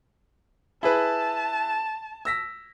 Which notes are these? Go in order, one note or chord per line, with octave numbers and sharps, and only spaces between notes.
E4 G#4 B4 A5
E6 A#6 B6